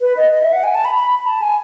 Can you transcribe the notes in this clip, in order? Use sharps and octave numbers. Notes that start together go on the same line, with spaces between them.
B4
D#5
D#5
E5
F#5
G#5
A5
B5
B5
B5
A5
G#5